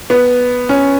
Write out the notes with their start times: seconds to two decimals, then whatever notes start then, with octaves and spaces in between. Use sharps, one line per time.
0.10 B3
0.69 C#4